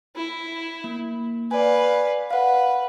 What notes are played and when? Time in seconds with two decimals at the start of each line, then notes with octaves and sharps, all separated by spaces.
0.16 E4
0.84 A#3
1.51 B4 D5 F5 G#5
2.31 B4 F5 F#5